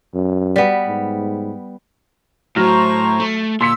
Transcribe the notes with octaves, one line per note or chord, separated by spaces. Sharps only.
F#2
G3 B3
G#2
A2 F#3 C5 A#5 C#6 F6 A#6
A3
A#2 C6 E6 B6 C#7